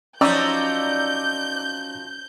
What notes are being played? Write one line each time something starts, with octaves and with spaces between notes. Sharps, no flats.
F3 F#3 C#4 D#4 D5 A#5 E6 G6